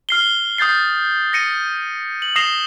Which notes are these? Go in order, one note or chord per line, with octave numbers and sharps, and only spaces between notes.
F6 C7 G7
D#6 G6 A6 C7
A#6 C#7 D#7
F#7
D#6 A#6 C7 E7 F7 G7